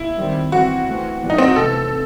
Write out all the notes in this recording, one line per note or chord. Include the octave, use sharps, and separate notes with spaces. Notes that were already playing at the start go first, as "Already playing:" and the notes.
Already playing: E4
D#3 G3 C4
E3 G3 C4 F#4
E3 A3 C4
A2 E3 G3 B3
D#4
C4
F#4
C3 E3 A3 A4